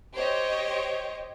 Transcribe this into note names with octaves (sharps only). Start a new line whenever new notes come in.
G4 C5 C#5 D#5